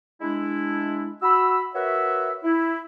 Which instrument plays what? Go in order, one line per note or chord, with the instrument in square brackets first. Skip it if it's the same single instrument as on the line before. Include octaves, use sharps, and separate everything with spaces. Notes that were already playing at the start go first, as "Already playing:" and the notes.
[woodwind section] G#3 D4 E4
F#4 B5 E6
F#4 A#4 B4 C#5 E5
E4